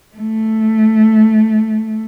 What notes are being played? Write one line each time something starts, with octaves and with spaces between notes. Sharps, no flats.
A3